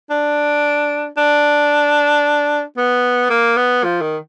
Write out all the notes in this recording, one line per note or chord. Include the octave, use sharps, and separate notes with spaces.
D4
D4
B3
A#3
B3
F3
D#3